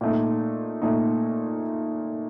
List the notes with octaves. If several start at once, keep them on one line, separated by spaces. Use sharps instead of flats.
A#2 A3 D#4
A#2 A3 D#4